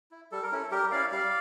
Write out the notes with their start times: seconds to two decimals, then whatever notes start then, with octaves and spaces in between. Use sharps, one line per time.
0.11 E4
0.31 G3 A4
0.43 A#4
0.52 C#4 E4 A4
0.71 G3 G4 A#4
0.91 C#4 E4 D5 F5
1.12 G3 D5 F5